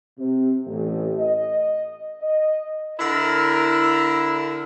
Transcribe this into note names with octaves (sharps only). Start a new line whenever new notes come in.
C3
A1
D#5
D#5
D3 E4 A#4